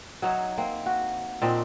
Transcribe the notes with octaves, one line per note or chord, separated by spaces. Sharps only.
F#3 D#4 C#5 E5
A#3 C4
F#4
A#2 C4 D4 D#4